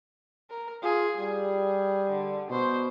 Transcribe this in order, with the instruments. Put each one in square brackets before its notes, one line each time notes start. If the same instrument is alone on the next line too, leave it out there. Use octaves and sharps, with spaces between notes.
[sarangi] A#4
[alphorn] F4 [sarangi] G#4
[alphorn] G3 [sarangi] G#4
[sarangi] D3
[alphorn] B2 [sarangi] C5